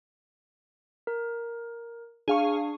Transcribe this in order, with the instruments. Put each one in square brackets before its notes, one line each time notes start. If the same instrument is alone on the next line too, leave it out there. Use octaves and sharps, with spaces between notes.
[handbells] A#4
[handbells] D4 [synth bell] G#4 F5 C#6